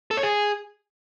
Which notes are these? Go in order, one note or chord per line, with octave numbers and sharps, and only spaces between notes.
A4
C#5
G#4